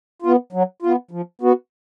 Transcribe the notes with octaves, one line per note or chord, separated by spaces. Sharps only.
B3 F4
F#3
B3 F4
F3
B3 F#4